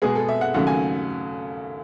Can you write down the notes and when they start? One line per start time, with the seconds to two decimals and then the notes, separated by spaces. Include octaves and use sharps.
0.02 B2 G#3 B3 G#4
0.15 A4
0.29 E5
0.41 F#5
0.54 D#2 C#3 F#3 A3 F#5
0.67 G#5